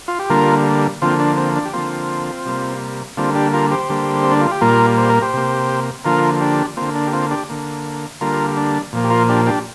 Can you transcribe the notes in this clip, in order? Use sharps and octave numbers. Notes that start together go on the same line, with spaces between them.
F4
G4
D3 G3 A#3 F4 A#4
D3 F3 A#3 C4 F4
D4
C4
D4
G4
D3 F3 A#3 C4 F4
C3 G3 A#3
D3 G3 A#3 C4 F4
D4 G4
F4 A#4
G4 C5
D3 G3 A#3
C4
D4
F4
G4
A#2 G3 A#3 F4 A#4
C5
A#4
G4 C5
C3 A#3
D3 F3 A#3 F4 A#4
D4 G4
D3 A#3 C4 F4
D4
G4
C4 F4
D4 G4
D3 A#3
D3 G3 A#3 F4 A#4
D4
A#2 F3 A#3
G4
F4 A#4
D4 G4
D4 G4